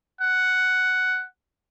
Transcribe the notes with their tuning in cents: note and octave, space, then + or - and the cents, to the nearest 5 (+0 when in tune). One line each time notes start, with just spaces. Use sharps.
F#5 +5